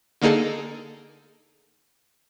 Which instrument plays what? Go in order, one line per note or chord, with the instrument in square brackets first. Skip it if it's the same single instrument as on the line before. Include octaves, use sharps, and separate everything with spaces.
[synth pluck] D3 A#3 D#4 G#4 A4